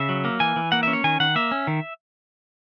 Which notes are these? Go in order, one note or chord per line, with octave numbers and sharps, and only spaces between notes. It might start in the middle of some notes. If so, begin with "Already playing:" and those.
Already playing: C#3 E5
F#3
A#3
E3 G#5
E3
A#3 F#5
E5
C#4
C#5
D#3 G#5
D#3 F#5
A#3 E5
C#4
D#3